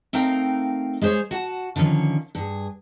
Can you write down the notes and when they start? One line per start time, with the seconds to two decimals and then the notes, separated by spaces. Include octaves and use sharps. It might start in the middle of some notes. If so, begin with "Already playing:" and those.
0.13 A3 C4 D#4 A#4 F5 G5
1.02 G#3 G#4 C5 C#5
1.31 F#4 F#5 A5
1.76 D3 D#3 F3 C#4
2.35 G2 G#4